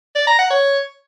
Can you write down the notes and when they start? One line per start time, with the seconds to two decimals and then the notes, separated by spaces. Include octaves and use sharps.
0.15 D5
0.27 A#5
0.39 F#5
0.51 C#5